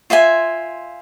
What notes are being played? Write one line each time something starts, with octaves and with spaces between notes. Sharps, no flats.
F4 C5 E5 G#5